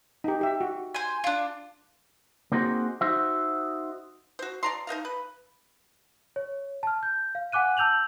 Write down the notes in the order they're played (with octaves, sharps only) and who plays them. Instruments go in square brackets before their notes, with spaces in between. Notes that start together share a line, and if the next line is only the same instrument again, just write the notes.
[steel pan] D#4 G4
G4 E5
F#4
[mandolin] C5 G#5
D4 F4
[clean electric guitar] A#3 C4 D#4 F#4 G#4 C5
D#4 F#4 C5 E5
[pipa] F#4 C5
D5 A#5 C6
D#4 C5 D#5 F5
B4
[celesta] C#5
A5 F6
G6
F5
F#5 G#5 D6 F#6 D#7
A5 E6 G6 F7 F#7